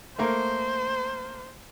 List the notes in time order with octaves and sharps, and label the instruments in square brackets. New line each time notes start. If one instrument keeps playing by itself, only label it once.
[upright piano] A3 A#3 A#4 [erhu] C5